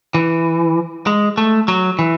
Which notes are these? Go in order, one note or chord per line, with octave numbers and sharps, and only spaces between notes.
E3
G#3
A3
F#3
E3